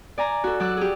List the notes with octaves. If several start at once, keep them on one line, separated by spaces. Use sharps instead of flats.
D5 G#5 A#5
F#4 A4
F#3 D5 E6 F#6
G4 G#4